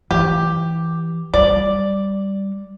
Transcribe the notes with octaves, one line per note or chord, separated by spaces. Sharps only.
E3 G4
G3 D5